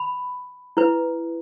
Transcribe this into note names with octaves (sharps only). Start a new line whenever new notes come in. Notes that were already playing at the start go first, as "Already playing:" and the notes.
Already playing: B5
E4 B4